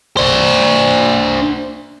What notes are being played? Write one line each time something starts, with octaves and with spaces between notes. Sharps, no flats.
D4 C5